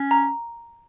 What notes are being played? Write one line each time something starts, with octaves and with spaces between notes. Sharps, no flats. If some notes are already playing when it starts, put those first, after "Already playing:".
Already playing: C#4
A#5